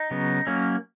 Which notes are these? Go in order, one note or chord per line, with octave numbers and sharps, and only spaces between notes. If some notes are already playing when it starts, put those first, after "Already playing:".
Already playing: D#4
C#3 F#3 B3
F#3 A#3 C#4